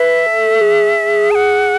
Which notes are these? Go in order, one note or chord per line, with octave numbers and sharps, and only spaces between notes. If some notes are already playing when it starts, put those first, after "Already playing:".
Already playing: B4 E5
A4
G#4
A5
F#5